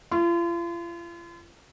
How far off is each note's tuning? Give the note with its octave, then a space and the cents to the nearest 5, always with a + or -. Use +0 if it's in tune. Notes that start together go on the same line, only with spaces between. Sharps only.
F4 -40